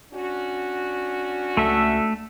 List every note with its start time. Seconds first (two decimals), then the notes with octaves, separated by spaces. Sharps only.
0.12 C#4 D4 F#4
1.57 C#2 A3 A4 E5